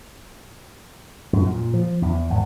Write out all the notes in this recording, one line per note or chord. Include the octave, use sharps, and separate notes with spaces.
F#2
A#2
F3
E2
G#1